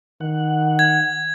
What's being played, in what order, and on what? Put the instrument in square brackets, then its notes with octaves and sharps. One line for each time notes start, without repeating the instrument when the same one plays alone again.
[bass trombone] D#3 [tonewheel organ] F#5
[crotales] G#6